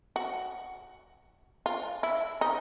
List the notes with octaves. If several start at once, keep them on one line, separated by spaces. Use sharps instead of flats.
F#4
F4
E4
D#4